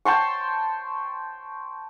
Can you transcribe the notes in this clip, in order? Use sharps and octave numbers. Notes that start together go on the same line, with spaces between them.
G5 A5 C6 C#6